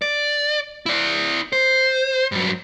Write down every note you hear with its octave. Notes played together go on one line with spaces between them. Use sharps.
D5
E4 D5
C5
G2 F#3